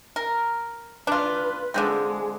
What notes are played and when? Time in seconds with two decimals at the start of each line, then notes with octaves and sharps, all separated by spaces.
0.16 A#4
1.07 D4 F4 B4
1.74 D3 F3 G#3 C4